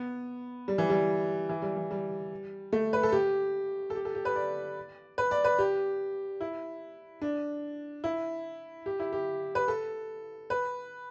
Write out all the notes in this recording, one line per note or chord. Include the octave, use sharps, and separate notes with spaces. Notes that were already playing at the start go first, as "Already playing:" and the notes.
Already playing: B3
G3
E3
G3
E3
G3
E3
G3
A3
B4
A4
G4
A4
G4
A4
G4
B4
D5
B4
D5
B4
G4
E4
D4
E4
G4
E4
G4
B4
A4
B4